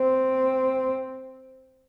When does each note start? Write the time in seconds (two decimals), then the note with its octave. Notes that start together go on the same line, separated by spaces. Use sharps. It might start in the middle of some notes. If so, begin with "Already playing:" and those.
Already playing: C4